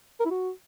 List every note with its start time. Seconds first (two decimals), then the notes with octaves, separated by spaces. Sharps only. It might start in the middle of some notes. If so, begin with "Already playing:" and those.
0.20 A#4
0.25 E4
0.31 F#4